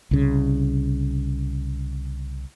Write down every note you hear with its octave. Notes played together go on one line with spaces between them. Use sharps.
C2 C#3